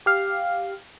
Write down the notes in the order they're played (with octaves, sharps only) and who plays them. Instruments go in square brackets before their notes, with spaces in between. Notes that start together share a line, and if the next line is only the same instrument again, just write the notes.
[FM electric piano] G4 F5